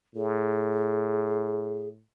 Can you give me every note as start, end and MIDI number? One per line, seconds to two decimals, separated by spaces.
0.15 2.02 45
0.15 1.87 68